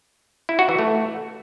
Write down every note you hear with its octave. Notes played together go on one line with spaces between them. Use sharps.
E4
F#4
E3
A3